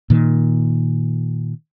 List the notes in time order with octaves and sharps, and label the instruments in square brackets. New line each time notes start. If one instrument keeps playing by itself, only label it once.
[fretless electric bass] A#2 D#3